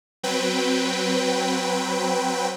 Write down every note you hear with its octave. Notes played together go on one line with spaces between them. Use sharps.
F#3 C4 B4 G5